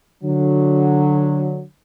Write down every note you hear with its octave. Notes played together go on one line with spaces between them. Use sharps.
D3 F#3